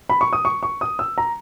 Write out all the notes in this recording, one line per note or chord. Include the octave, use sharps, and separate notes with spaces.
B5
C#6
D#6
C#6
C#6
D#6
E6
A#5